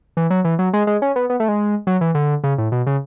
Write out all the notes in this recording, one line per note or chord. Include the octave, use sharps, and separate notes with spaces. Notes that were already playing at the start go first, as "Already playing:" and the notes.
E3
F#3
E3
F#3
G#3
G#3
C#4
B3
B3
A3
G#3
F#3
E3
D3
C#3
A2
B2
C#3